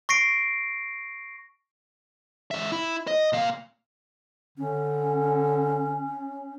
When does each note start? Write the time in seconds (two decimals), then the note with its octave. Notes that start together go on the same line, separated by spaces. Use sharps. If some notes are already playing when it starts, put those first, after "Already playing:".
0.09 C#6 A#6 C7 D7
2.51 G#2 E5
2.72 E4
3.08 D#5
3.33 A#2 F5
4.58 D3 C#4